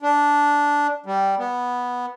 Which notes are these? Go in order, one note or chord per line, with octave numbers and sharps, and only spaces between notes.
D4
G3
B3